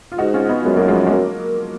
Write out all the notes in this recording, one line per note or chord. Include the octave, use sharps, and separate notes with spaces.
F4
G#2 D#4 F#4
C#4 F4
B3 D#4
F#2 G#3 B3
F#3 A#3
F3 G#3
G#3
F#3 A#3